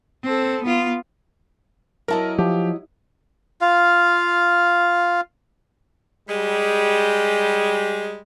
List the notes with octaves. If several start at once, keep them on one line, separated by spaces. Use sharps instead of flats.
C4 A4
B3 F4
F#3 E4 A#4 D#5 A5
F3 G4
F4 F5
G3 G#3